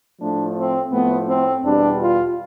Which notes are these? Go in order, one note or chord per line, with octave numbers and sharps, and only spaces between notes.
A2 F3 A3 D4
C4
A2 F3 A3 B3
C4
E2 B2 G3 D4
F4